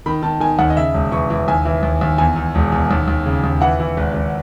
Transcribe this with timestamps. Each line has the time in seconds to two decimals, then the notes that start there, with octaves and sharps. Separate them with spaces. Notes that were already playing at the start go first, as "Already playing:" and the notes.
0.06 D#3 B5
0.23 D#3 A5
0.40 D#3 G#5
0.59 D#2 F#5
0.70 D#5
0.77 C#3 E5
0.94 E1
1.11 E3 C#6
1.30 E3
1.48 D#2 G#5
1.65 E3
1.83 D#2
2.01 D#2
2.18 E2 G#5
2.36 E2
2.55 E1
2.72 E2
2.91 D#2
3.08 D#2
3.26 C#3
3.44 D#2
3.61 E3 F#5
3.80 E3
3.97 G#1
4.14 G#1